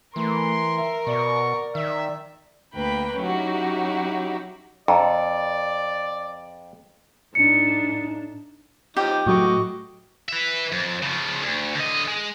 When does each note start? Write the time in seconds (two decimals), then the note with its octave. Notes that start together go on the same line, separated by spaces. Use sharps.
0.16 E3 A3 A#4 C6
0.77 E5
1.07 B2 D5 C#6
1.75 D#3 E5
2.73 D2 A#3 B4 G5 B5
3.19 F#3 C#4 D#4 E4 F#4 G4
4.88 F2 D5 G5 A5 A#5
7.35 A2 D4 D#4 C#7
8.97 F3 D#4 G4 D6
9.26 A2 F#3 A3 F#4 D#5 C#6 D6
10.29 B4 E5
10.72 F2
11.02 C#3 F3
11.42 D2
11.75 D3 D#5
12.07 G#3